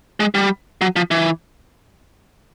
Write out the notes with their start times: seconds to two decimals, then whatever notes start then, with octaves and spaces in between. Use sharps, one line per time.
0.20 G#3
0.35 G3
0.81 F#3
0.96 F3
1.11 E3